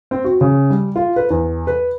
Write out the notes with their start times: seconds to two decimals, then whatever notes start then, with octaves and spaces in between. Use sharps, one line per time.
0.11 C4
0.25 F#4
0.41 C#3
0.70 G3
0.96 F4
1.16 B4
1.30 E2
1.67 B4